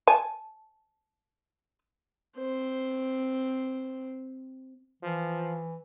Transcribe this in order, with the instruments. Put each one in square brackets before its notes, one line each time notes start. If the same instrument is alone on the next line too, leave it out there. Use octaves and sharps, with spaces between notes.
[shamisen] G#5 A5
[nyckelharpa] C4 C5
[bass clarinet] E3 [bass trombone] F3